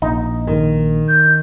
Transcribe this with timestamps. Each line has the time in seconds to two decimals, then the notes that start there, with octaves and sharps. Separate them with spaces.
0.02 A#1 D#4
0.47 D#3
1.08 G6